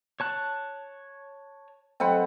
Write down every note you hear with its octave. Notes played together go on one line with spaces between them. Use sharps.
C#5 A5 F#6
F#3 C4 A4 B4 D#5 F#5